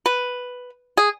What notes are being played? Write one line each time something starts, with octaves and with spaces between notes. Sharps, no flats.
B4
G#4